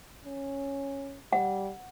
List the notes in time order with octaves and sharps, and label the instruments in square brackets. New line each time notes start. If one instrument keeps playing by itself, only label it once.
[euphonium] C#4
[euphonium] G3 [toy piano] F#5